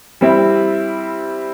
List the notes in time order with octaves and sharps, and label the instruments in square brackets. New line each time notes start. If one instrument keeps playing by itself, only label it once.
[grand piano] G3 C4 E4